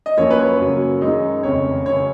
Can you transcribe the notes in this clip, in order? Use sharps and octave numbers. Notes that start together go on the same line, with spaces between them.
D#5
F#2 F3 A#3 C#4 C#5
B4
C#5
F#2 C#3 F#3 A#3 C#4
F#2 D#3 G#3 D#4
F1 F2 C#3 C#5
F#2 C#3 C#5